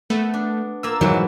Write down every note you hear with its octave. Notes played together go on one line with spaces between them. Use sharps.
A3 B3
D4
A#3 F4 E6
G#2 B2 E3 F#3